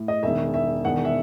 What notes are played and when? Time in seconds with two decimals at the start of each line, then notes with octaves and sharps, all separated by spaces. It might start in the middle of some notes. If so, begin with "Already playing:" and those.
Already playing: A2
0.08 D#5
0.23 E1 E2 D#3 E5
0.54 E5
0.84 E1 E2 D#3 F#5
1.05 E5